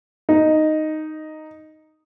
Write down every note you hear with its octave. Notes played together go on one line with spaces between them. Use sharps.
D#4